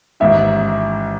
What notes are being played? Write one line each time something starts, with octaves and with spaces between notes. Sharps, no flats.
A1 G#2 D#3 E5